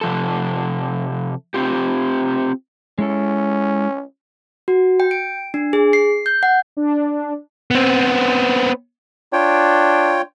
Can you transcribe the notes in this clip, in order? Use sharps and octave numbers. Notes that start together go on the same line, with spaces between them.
C3 F3 A4
C4 F4 G4
G#3 C#4 E4 A4
F#4
G5
D7
D4
G#4
C7
G6
F#5
D4
B3 C4
D4 F4 C#5 G5